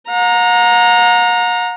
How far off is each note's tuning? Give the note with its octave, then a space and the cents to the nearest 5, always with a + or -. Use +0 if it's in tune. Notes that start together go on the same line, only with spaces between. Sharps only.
F#5 -45 A#5 +0